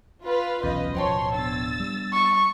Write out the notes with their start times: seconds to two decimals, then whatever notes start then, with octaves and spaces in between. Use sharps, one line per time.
0.23 F4 B4 F5
0.63 D#1 B1 E2 C#4 B4 D#5
0.95 D1 B2 F3 C5 C#5 G5 A5 C6
1.35 B3 D4 E6 A6
1.80 G3
2.13 C#6